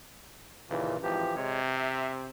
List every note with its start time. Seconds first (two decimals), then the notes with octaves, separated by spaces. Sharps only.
0.70 D#2 A#2 C#3 E3
1.03 G#1 E3 F3 G4
1.36 C3 G#3 C#5
1.76 E5